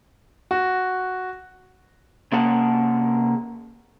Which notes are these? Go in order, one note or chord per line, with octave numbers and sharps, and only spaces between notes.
F#4
C3 A#3 C#4 G#4 F#5 A5